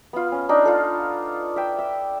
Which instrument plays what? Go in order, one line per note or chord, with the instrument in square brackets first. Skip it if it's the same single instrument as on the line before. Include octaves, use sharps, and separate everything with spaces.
[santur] B3 F4
C#4
D4 D#4 D5
F4 A4
E5 G5
E5